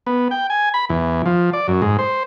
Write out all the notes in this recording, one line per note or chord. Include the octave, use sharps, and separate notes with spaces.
B3
G5
G#5
B5
E2
F3
D5
F#2
G#2
C5